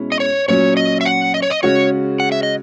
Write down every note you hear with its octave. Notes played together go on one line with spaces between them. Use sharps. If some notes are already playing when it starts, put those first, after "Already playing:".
Already playing: B2 G#3 C#4 E4
D#5
C#5
A#2 F#3 C#4 C#5
D#5
E5
F#5
D#5
C#5
D#5
C#3 G#3 C#4 F#4 C#5
F#5
E5
D#5